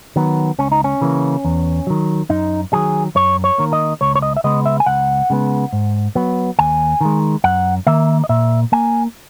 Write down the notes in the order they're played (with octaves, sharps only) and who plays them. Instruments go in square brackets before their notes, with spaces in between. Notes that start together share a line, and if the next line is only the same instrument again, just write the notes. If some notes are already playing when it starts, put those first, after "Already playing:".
[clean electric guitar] D#3 F#3 B3
C#2 C#4
D#4
C#4
C#3 E3 A#3
E2
D#3 F#3
F#2 D#4
D#3 F#3 G#4
F#2 C#5
C#5
D#3 A#3
D#5
C#2 C#5
C#5
D#5
E5
C#3 G#3 B3 D#5
E5
G#5
C#2 F#5
C#3 G#3 B3
G#2
F#3 B3
D#2 G#5
D#3 G#3
F#2 F#5
D#3 A#3 E5
D#5
A#2 E5
A#3 G#5